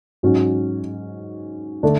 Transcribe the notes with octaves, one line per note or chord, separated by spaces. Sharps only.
G#2 F#3 C#4 F#4
D3 A3 D4